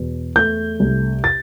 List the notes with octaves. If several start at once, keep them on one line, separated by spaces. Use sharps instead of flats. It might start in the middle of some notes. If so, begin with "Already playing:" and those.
Already playing: E2 B2
A3 G6
C2
A6